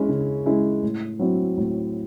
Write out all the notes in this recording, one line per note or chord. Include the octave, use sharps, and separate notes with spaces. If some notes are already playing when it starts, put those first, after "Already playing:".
Already playing: G#3 C#4 E4
C#3
G#3 C#4 E4
A2
F#3 C4 E4
A2